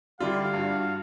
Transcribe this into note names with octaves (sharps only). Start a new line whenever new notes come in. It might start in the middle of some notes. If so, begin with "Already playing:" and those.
D3 G3 D4 E4 F4 F5
G2 F#4